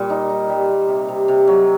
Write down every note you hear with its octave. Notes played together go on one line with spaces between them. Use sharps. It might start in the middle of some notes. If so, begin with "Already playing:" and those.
Already playing: A#2 G3
D#4
D#4
G3
A#3
C3
C3
C3
F#3